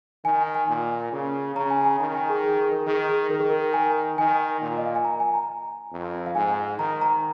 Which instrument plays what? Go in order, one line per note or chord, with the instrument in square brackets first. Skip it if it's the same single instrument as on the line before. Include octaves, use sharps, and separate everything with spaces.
[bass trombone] D#3 [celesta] G#5
[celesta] G#5
[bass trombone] A#2
C#3
[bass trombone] C#3 [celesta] A#5
[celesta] G#5
G#5
[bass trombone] D#3 [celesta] A#5
[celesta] G#5
G#4
G#4
G#4
A#4
[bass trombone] D#3 [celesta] G#4
[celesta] G#4
[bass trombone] D#3 [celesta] A#4
[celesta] G#4
A#4
G#5
[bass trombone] D#3 [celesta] G#5
[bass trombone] A#2
[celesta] D#5
F5
G#5
A#5
G#5
A#5
[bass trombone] F2
[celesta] F5
[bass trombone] G#2 [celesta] G#5
[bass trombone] D#3 [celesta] A#5
[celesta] A#5